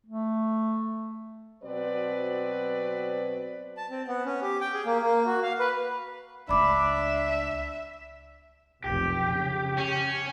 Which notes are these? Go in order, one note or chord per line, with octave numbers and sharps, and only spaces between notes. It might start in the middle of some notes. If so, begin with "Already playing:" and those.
A3
B2 F#3 C4 B4 C5 D5
A5
C4
B3
C#4
G4
G5
G#4
A#3
A#3
F#4
F5
B4
C#2 A3 D4 E5 B5 D6
F1 B1 G4
C#3
C#4